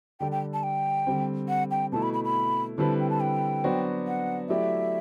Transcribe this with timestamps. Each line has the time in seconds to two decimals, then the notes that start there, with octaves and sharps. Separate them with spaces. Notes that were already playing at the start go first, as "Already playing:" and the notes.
0.20 D3 G3 D4 A4 G5
0.32 G5
0.53 A5
0.63 G5
1.07 D3 G3 C4
1.49 F#5
1.71 G5
1.92 B2 A3 E4 A5
2.03 B5
2.13 B5
2.25 B5
2.78 D3 G3 C4 E4 B4 A5
3.00 G5
3.10 A5
3.20 G5
3.64 F#3 B3 D4 F#4 C5
4.07 F#5
4.49 F#3 A3 E4 G4 D5 E5